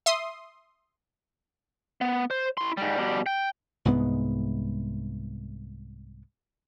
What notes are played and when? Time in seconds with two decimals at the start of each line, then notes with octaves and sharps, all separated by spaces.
0.06 E5 C6 D#6
2.01 B3
2.31 C5
2.57 E4 C6
2.77 G#2 G3
2.98 B2 G3
3.26 G5
3.85 C2 G#2 G#3 B3